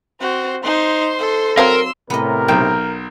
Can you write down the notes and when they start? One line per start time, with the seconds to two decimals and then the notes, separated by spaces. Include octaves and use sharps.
0.21 C4 F#4 C5
0.64 D#4 C5 C6
1.19 A4
1.57 F#3 C4 A#4 F5 C6 E6
2.10 A2 C3 B3 A#4 D#5
2.48 B1 A#3 G5